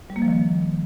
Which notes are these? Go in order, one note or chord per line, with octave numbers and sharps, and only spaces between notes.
G3
A#3
F3
D#3